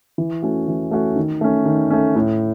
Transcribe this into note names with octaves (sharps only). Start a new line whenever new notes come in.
E3
A3 C#4 F#4
E3
A3 C#4 F#4
D#3
A3 C#4
D#3
A3 C#4
A2